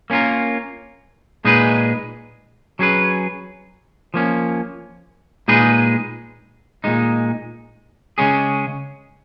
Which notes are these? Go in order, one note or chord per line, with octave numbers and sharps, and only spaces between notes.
A#3 C#4 F4 A#4
A#2 G#3 D#4 G#4 B4
F#3 C#4 G#4 B4
F3 A#3 C#4
A#2 G#3 D#4 G#4 B4
A#2 G#3 D#4
C#3 G#3 C#4 G#4